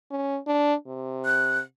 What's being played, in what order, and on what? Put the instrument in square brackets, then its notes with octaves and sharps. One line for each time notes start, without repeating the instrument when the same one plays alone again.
[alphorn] C#4
D4
C3
[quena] F#6